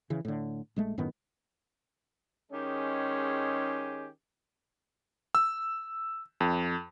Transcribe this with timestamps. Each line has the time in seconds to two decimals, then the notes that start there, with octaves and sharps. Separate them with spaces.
0.10 C#3 E3
0.25 A2 D3
0.76 A#1 G#3 A3
0.98 F#2 A2 D#3 B3
2.52 D#3 G#3 C#4 G4 G#4
5.35 E6
6.40 F2